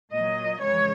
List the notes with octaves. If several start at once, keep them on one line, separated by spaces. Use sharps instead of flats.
A#2 F#3 D#5
F2 C#3 E3 G#3 C#5